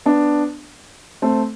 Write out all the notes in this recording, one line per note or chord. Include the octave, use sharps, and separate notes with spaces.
B3 D4
A3 C4